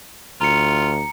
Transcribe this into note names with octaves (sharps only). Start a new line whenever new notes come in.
D2 F4 A#5 C#7